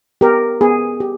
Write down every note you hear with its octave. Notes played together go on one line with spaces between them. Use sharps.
B3 G4 A#4
B3 G#4
G4